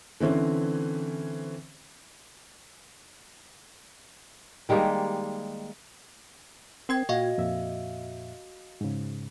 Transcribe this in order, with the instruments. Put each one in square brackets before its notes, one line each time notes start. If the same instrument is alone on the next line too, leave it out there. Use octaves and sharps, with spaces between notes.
[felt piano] D3 E3 C4 C#4 C5
[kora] D#3 G3 G#3 A#3
[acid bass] C4 [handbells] A#4 G5 G#6
[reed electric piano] A#2 [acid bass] F#4 [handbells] D#5 F5
[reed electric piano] F2 A#2 E5
G#2 C#3